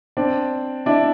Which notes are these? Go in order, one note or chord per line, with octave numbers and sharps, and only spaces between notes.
C4 D4
D4 E4